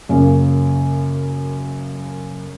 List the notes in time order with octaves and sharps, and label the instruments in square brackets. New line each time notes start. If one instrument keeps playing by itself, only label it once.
[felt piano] F#2 C#3 A#3